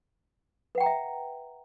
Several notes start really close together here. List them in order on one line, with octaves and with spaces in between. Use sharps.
B4 F#5 G5 A#5 E5